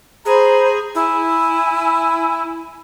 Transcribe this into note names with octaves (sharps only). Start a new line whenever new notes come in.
G#4 C5 A#5 B5
E4 G#5